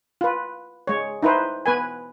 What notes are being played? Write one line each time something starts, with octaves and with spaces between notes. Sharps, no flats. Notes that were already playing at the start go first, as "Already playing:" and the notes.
F4 B4
G#3 C#5
D#4 E4 B4 C5
B3 B4 G#5